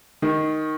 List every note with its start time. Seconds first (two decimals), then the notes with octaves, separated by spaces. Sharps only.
0.22 D#3